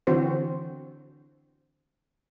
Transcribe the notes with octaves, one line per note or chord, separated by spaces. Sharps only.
D3 E3 C4 F#4 C5